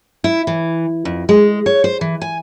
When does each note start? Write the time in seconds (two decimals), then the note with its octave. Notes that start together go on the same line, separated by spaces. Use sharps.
0.24 E4
0.47 E3
1.05 F2
1.29 G#3
1.66 C#5
1.84 C5
2.01 E3
2.21 G#5